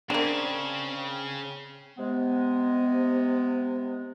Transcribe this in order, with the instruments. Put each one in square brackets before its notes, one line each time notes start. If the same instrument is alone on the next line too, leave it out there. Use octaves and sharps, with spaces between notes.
[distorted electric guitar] C#3 [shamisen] G#3 A#3 [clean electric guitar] C4 [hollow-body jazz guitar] D4
[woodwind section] C3 G#3 B3